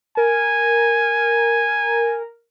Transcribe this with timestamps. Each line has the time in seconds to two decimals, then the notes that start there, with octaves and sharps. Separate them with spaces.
0.17 A#4 G#5